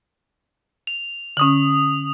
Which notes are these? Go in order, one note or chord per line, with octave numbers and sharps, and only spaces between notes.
F7
D3 C#4 D#6 F#7